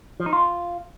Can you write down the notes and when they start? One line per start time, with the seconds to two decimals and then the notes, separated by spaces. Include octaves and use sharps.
0.20 F3
0.26 D#4
0.33 F4